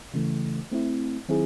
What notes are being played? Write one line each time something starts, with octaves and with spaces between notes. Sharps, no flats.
C#3 E3 A3
A3 C4 E4
D#3 F#3 C4 E4 G#4